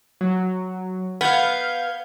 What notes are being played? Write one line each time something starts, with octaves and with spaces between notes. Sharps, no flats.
F#3
B3 F5 G6 G#6